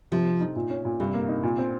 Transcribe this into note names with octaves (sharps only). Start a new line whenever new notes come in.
C3 F3
C4
D#4
A#2
C#4
A#2
G2 C3
A#3
D#4
A#2
C4